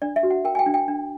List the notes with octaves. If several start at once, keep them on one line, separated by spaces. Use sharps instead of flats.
D4 D5
E5
F#4
F#5
A#4 G5
G#5
G5
D4
G5
D4